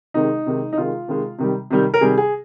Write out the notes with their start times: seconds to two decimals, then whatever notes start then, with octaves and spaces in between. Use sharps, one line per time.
0.14 C3 D#3 G#3 D#4
0.46 C3 D#3 G#3
0.73 D#4
0.77 C3 D#3 G#3 F4
1.08 C3 D#3 G#3
1.39 C3 D#3 G3
1.71 C3 D#3 G3
1.94 A#4
2.01 C3 D#3 G3 G#4
2.18 G#4